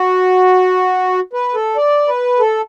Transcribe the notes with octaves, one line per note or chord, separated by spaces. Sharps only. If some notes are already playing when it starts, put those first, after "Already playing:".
Already playing: F#4
B4
A4
D5
B4
A4